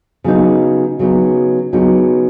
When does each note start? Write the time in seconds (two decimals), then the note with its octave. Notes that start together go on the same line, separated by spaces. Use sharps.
0.24 C#3 F#3 B3 D#4
0.99 C#3 F#3 B3 D#4
1.73 C#3 F#3 B3 D#4